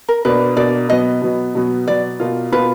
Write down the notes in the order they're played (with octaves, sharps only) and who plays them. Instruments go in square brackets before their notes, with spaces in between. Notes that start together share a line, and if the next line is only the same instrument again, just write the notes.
[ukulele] A#4
[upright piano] B2 A#3 D4 [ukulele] B4
[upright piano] B2 A#3 D4 [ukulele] D5
[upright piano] B2 F#3 B3 [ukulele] D#5
[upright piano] B2 F#3 B3
B2 F#3 B3
[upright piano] B2 F#3 B3 [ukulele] D5
[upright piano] B2 A#3 F4
[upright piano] B2 A#3 F4 [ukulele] B4